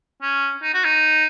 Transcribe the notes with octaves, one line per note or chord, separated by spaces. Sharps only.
C#4
D#4
F#4
D#4